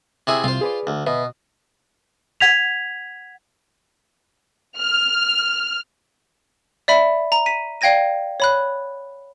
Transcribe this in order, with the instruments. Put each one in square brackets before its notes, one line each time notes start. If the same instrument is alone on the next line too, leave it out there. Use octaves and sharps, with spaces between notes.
[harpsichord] C3 E4 G#4
[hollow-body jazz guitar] C2 C3 F5 [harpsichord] F4 C5
[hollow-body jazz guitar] G#4 B4 D5
[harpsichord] D2
[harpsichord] B2 [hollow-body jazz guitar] B4 E5
[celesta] F#5 G#6 B6 F7
[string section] F6
[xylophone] D5 E5 B5
A#5
B6 D#7
D5 F5 G5 G#6 A#6 D#7
C#5 B5 F#6